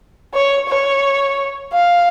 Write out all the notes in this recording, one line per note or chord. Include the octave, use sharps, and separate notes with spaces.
C#5
C#5
F5